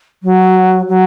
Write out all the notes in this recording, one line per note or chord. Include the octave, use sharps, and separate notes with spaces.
F#3
F#3